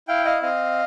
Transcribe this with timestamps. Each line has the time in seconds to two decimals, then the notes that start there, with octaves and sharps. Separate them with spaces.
0.08 E4 F5 G5
0.25 D#5 F5
0.42 C4 D#5 F5